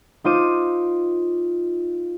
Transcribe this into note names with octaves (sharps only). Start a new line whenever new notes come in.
D#4 F4 C5 D6 D#7